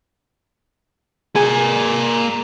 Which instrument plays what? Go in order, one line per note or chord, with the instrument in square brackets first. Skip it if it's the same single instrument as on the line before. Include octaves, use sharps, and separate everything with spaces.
[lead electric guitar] A#3 G#5 [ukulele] G#4